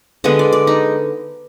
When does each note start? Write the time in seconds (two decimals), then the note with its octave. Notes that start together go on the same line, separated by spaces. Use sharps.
0.24 D3 G#3 B3 D#5
0.39 D5
0.53 D5
0.67 D#4